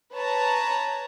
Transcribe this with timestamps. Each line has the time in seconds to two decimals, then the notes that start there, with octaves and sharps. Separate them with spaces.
0.13 B4 C#5 A5 A#5